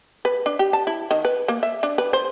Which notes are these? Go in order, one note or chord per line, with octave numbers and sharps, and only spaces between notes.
B4
D4
G4
A5
E4
D#3
B4
A#3
E5
D4
B4
C5